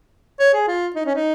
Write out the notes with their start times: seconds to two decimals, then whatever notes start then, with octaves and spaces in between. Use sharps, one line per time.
0.40 C#5
0.54 G#4
0.68 F4
0.95 D#4
1.06 C#4
1.15 D#4